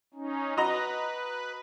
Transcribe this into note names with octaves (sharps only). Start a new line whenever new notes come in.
C#4 D#4
F#4 B4 D#5 A#5